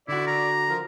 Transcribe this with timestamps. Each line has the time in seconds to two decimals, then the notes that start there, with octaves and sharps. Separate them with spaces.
0.08 D3 E4 F#4 D5
0.27 A#5
0.69 F3 A#4